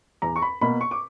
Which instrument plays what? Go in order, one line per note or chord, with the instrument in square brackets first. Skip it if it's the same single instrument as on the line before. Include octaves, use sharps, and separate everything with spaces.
[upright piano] E2 A#5
C#6
B5
B2 A#3 B5
C#6
D6